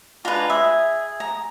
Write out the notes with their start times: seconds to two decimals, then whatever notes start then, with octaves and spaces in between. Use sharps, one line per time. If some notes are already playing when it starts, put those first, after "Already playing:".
0.25 G#3 D4 F4 B4 A#5
0.50 G#4 E5
1.20 A#5